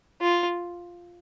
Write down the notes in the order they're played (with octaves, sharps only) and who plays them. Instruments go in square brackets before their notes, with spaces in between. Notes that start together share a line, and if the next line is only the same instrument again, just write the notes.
[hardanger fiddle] F4